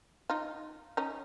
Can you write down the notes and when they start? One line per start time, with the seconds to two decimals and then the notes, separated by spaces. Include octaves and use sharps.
0.30 D#4 F4
0.97 C#4 D#4